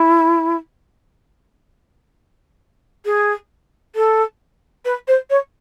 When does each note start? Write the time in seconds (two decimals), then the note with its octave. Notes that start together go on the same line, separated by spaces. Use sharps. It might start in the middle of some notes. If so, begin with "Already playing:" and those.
Already playing: E4
3.05 G#4
3.95 A4
4.85 B4
5.08 C5
5.30 C#5